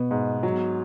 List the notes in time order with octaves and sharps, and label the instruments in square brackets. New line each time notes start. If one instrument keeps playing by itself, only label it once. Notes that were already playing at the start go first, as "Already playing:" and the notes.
Already playing: [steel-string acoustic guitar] B2 [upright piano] B3
[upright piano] G#2
F#3